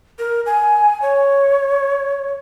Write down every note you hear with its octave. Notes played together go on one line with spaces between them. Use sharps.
A#4
G#5
C#5